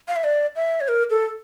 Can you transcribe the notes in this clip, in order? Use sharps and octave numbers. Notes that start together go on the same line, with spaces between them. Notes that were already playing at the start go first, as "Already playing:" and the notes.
F5
E5
D5
E5
C#5
A#4
A4